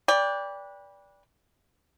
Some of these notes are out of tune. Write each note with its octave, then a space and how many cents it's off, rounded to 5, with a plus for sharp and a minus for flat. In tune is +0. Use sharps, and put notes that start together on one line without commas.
B4 -20 D5 -15 G5 +25